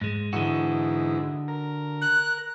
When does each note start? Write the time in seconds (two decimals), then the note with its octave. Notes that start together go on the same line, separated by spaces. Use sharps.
0.01 G#2 G#3
0.33 G#2 D3 E3 D#4 F#4
1.48 A#4
2.01 F#6